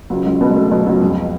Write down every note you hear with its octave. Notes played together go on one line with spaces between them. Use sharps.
C#2 F#3
C#2 G#3
B2 B3
G#3
B2 A3
B2 F#3
C#2 F#3
F2 G#3